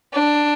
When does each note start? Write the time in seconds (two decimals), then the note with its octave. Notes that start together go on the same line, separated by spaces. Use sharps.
0.13 D4